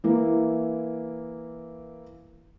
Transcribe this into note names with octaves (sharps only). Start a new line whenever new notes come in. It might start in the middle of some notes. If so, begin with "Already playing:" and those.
E3 A#3 E4